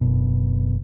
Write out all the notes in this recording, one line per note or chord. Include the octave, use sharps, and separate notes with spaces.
F#1 B2